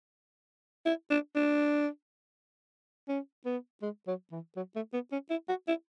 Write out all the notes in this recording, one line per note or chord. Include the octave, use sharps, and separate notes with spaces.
E4
D4
D4
C#4
B3
G#3
F#3
E3
F#3
A3
B3
C#4
E4
F#4
E4